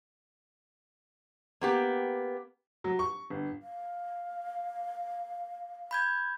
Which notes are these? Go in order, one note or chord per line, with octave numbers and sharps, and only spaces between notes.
A#3 B3 G4
F#3
C#6
G1
F5
B5 G6 G#6